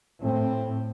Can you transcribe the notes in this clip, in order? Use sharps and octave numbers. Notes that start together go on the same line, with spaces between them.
A2 A3 C4